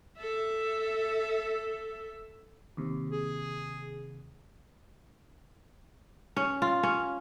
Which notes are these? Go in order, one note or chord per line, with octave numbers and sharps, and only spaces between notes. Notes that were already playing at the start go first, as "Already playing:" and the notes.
A4 E5
D#2 C3
G#4
C#4
F4
C#4